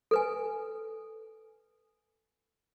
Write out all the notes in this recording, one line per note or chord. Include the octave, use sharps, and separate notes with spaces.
A4 B4 G#5